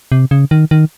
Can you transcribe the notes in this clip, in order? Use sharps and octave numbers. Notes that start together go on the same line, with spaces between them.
C3
C#3
D#3
D#3